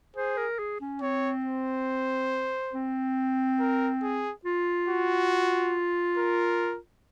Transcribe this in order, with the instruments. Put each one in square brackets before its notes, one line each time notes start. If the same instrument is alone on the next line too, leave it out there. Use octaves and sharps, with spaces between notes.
[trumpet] G#4 [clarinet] C5
[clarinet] A#4
G#4
C#4
[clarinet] C4 [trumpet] C#5
[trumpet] C5
[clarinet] C4
[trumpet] A#4
G#4
[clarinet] F4
[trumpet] F#4
A#4